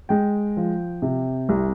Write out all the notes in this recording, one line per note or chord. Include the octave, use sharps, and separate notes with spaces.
G#3 G5
F3
C3
C2